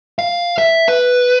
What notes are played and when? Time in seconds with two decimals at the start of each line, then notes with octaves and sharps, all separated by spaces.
0.19 F5
0.58 E5
0.88 B4